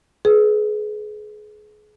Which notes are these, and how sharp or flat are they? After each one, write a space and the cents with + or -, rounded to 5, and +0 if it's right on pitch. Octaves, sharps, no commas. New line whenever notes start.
G#4 +30 B4 +0